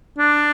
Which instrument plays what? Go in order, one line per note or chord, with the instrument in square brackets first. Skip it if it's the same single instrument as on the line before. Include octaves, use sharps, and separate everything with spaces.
[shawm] D4